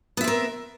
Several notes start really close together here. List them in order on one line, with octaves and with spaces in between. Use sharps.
B3 E5 C4 A#4